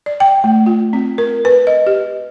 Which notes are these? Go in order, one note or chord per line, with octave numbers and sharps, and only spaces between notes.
D5
G5
A3
F4
C4
A#4
B4
D#5
G4